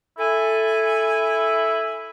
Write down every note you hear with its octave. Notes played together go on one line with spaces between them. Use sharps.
E4 A4 G#5